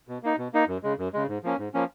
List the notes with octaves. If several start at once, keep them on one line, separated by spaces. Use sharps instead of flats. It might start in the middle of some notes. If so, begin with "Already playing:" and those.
B2
A#3 D#4
B2
A#3 D#4
F#2
C#3 G#3
F#2
C#3 G#3
G#2
F3 A#3 C#4
G#2
F3 A#3 C#4